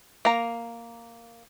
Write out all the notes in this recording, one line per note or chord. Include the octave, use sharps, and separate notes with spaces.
A#3 A#5